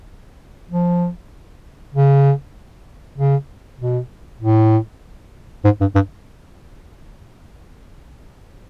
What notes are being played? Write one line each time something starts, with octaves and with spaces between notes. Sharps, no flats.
F3
C#3
C#3
B2
A2
G#2
G2
G2